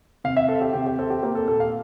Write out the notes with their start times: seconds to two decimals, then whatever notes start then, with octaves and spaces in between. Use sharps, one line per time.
0.24 C3 F5
0.37 E5
0.48 C4 A4
0.61 G4
0.73 C3 G4
0.86 G4
0.99 C4 A4
1.10 G4
1.23 A#3 G4
1.35 A4
1.48 A#2 A4
1.60 F5